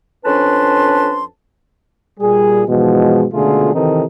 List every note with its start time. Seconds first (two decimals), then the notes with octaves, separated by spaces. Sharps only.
0.25 F2 C#4 D4 B4 A5 C6
2.20 A#2 G3 G#4
2.68 G#2 B2 E3 F3 G#3
3.33 C#2 B2 D3 A3 F4 G#4
3.74 C3 D#3 E3 C4 D#4 A4